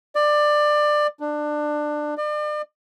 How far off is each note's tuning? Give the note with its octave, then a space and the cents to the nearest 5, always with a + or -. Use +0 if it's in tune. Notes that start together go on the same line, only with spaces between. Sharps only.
D5 +20
D4 +20
D5 +40